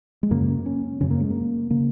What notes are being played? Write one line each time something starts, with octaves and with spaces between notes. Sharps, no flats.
G#3
F#2 C#3 A#3
C#4
F#2 C#3 C#4
A#3
G#3
A#3
C#3 A#3